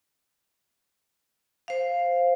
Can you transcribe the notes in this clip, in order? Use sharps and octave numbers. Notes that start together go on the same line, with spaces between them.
C5 F5